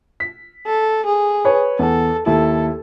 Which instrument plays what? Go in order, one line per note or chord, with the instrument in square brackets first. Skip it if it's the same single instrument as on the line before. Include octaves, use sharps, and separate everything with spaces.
[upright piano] B6
[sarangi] A4
G#4
[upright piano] B4 C#5
[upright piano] E2 [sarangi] A4
[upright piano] D#2 E4 [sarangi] A4